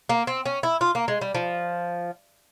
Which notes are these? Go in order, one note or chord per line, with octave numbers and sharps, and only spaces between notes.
A#3
C4
C#4
E4
F4
A#3
G#3
G3
F3